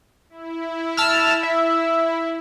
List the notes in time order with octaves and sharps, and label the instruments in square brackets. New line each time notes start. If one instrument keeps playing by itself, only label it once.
[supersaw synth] E4
[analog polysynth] A5 E6 F6
E5